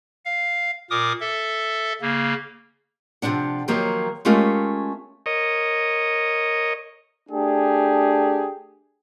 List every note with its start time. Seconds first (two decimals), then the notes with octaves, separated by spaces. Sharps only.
0.25 F5
0.90 A#2 A#4 D6 D#6
1.20 A4 E5
2.01 C#3 A#3
3.22 C3 D#3 F3 D4 F#5
3.68 D#3 F3 F#3 A#3 G4
4.25 G#3 A3 C#4 F4 G4 A#4
5.26 A#4 C#5 D#5
7.30 A3 D4 G4 G#4